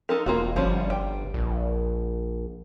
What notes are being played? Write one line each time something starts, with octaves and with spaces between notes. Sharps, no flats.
D#4 A4 A#4
E1 A#3 F4 F#4
G1 F3 G3 C#4
G5
A#1